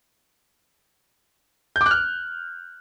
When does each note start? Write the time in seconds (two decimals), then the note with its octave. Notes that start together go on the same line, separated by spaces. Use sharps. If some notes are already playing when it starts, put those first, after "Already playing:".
1.76 G6
1.81 D6
1.86 F#6
1.91 F6